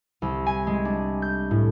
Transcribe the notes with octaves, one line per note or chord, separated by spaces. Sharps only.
C2
G#5
G#3
D4
G6
A2